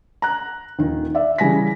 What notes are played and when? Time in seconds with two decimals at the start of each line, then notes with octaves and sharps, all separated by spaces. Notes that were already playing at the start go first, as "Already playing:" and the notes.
0.22 A#5 F#6
0.79 D#1 D#3
1.15 D5 E5
1.38 C#3 E3 G3 G#5 A#6 B6